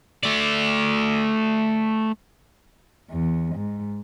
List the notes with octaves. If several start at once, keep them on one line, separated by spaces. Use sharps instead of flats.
A3 D5
E2
G#2